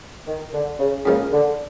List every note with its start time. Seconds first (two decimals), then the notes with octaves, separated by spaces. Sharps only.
0.27 D#3
0.53 D3
0.79 C#3
1.05 G#2 C#3 F3 A#3 D#4
1.33 D3